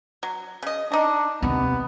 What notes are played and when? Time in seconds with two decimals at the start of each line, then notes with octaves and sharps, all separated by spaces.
0.23 F#3
0.62 C#3 D#5
0.92 D4 D#4 A#5
1.42 D#2 C3 B3